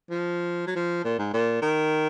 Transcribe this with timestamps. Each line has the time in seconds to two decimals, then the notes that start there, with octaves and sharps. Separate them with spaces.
0.10 F3
0.67 F#3
0.76 F3
1.04 A#2
1.19 G#2
1.33 A#2
1.62 D#3